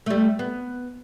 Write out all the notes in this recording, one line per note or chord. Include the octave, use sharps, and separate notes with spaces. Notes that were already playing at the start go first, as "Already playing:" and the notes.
G3 A3
B3